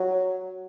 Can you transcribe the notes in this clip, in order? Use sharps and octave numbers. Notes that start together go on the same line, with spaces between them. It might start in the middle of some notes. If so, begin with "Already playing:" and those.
Already playing: F#3